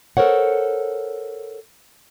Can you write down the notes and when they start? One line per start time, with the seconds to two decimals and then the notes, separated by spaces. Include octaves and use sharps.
0.17 A4 A#4 C5 C#5 F#5